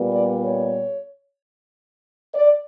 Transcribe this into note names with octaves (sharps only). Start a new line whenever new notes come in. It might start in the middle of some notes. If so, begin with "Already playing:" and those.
Already playing: A#2 G3 B3
D5
C#5
D5